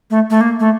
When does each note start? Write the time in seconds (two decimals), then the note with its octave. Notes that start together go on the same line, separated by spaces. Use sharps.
0.10 A3
0.30 A3
0.41 A#3
0.60 A3